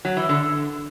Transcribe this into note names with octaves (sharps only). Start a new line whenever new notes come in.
F#3
E3
D3